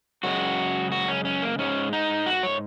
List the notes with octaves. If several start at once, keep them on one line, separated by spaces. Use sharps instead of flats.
F#2 C#3 G#3 F#4
F#4
C#4
C#4
A#3
G#2 G#3 C#4
D#4
F#4
C#5